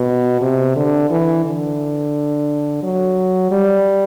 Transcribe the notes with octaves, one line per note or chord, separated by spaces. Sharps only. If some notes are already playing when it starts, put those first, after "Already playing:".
Already playing: B2
C3
D3
E3
D3
F#3
G3